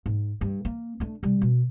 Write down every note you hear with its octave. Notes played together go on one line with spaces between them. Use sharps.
G#2
G2
A#3
A3 D4
C3 G3
B2